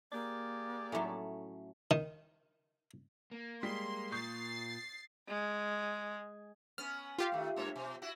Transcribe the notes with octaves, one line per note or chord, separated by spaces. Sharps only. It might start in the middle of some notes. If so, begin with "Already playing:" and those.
A#3 G4 G#4 D5
A2 F#3 A3 C#4
D#3
A#3
G3 G#3 C6 B6
A#2 C#6 D#6 G6 A6 C7
G#3
B3 C#4 F6
F4 G4 F5
D#3 A3
G2 A3 C#5
B2
E4 F#4